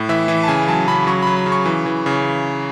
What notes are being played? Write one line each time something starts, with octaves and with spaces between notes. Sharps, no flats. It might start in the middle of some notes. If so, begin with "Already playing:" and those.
Already playing: A2
E3 E5
E3
A5
C#3 G#5
F#3 A5
C#3 B5
F#3 C#6
F#3 B5
B5
C#3
C#6
E3
E3
C#3